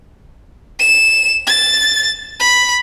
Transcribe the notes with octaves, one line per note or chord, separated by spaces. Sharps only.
E7
A6
B5